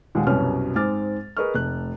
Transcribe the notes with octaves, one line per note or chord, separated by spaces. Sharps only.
D#2 A#2 G#3 F#5
C2 F#2 B2 C#4 B4 F6
G#2 G#3 C4 D6 F6 A6
G#4 A#4 B4 D#5 C#6 F6
F1 A3 F#6